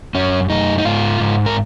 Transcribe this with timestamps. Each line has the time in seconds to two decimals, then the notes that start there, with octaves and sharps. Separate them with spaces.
0.14 F#2 C#4
0.49 F#2 D#4
0.78 D#4
0.85 G#2 F4
1.20 G#2
1.46 A#4